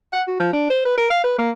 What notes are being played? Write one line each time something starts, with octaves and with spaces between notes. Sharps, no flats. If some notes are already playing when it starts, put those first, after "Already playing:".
F#5
F#4
F3
D4
C5
B4
A#4
F5
B4
A#3